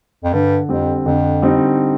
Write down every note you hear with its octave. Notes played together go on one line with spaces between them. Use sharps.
F2
G2 D3
F2 G3 C4
F2 D3
G3 C4 D#4